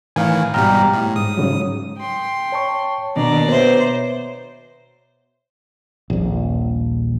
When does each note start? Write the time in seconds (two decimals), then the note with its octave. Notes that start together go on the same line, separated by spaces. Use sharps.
0.16 A2 D#3 E3 F5 G#5
0.54 G#2 B2 G3 G5 A#5 F6
0.93 A2
1.16 G#2 D#6
1.37 G#2 C#3 F#3
1.97 G5 C6
2.52 C#5 A5 C#6
3.16 B2 D#3 A#3 D4 D5 A#5
3.48 B2 C5 C#5 E5
6.10 D#1 A#1